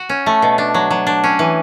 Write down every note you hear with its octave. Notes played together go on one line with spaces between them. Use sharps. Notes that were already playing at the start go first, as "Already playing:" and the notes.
Already playing: F#4
C#4
A3
B2
D4
F#3
F#3
D4
C#4
E3